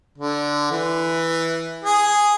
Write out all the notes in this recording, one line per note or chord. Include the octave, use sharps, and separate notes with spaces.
D3
E3
G#4